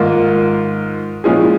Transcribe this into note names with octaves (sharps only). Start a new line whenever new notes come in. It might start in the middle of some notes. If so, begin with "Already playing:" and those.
Already playing: G#2 D#3 A#3 F4
A#2 F3 G#3 C#4 G#4